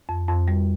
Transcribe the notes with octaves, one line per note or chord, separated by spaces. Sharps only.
F2
F2
G3